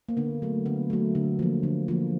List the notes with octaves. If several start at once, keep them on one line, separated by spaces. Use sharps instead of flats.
A#3
D3 B3
F#3 A3
D3 B3
F#3 A3
D3
F3 A#3
D3
F3 A#3